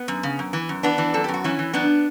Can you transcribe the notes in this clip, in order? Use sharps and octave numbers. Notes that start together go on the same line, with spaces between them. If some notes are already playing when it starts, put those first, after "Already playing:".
Already playing: B3
F#2
C#3
F#2
E3
F#2
E3 B3 D4
E3
F#2 A4
G4
F#2
F#4
E3 C#4 E4
E3
F#2 B3 D4